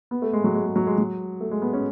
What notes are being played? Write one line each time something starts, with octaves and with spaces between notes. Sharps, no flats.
B3
A3
G#3
F#3
G#3
G#3
F#3
G#3
F#3
A3
G#3
B3
C#4